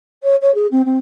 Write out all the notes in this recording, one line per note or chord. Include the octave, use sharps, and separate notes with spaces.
C#5
C#5
G#4
C4
C4